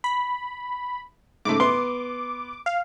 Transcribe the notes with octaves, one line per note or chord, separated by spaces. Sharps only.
B5
G#2 C#3 A3 D6
B3 C6
F5